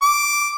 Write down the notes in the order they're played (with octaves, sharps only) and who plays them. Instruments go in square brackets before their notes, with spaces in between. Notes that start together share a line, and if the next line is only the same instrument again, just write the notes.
[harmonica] D6